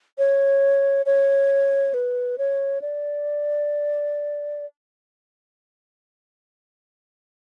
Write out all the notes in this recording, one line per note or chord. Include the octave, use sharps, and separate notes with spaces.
C#5
C#5
B4
C#5
D5